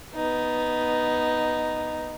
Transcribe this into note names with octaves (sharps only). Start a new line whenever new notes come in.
B3 D#4